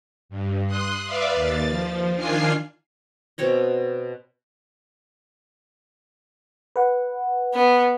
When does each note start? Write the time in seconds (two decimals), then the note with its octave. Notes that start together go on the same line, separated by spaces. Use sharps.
0.29 G2
0.67 C6 D#6 F#6
1.05 B4 D5 E5 F5
1.33 D#2 A6
1.69 F3
2.15 D#3 D4 F4 G#5 F6 C7
3.38 B2 C4 C#5 D#5
6.76 B4 F#5
7.54 B3